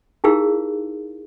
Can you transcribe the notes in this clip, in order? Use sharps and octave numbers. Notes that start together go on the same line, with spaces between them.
D#4 E4 G4 G#4 A#4 F5